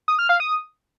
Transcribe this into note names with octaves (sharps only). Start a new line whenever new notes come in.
D#6
F6
F5
D#6